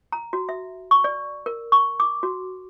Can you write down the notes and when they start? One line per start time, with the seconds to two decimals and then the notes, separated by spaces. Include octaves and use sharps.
0.12 A#5
0.33 F#4
0.49 E5
0.91 C#6
1.04 D5
1.46 A#4
1.72 C#6
2.00 D6
2.23 F#4